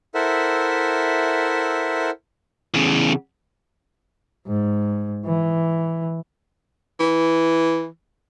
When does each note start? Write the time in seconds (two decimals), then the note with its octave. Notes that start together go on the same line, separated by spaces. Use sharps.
0.15 E4 A4 A#4 C5 E5 F#5
2.74 E2 C#3
4.47 G#2
5.25 E3
7.00 E3